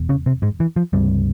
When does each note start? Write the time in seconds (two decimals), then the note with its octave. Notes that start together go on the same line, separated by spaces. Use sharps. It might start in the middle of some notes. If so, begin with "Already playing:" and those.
Already playing: E1 E2
0.09 C#3 C#4
0.26 C3 C4
0.42 G#2 G#3
0.60 E3
0.76 F3
0.93 C#2 G2 C3 G3